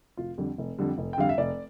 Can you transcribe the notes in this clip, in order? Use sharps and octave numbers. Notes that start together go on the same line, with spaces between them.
F1 F4
F2 D3 G3
F1
F2 D3 G3
F1
G5
F2 D3 G3 F5
E5
F1 D5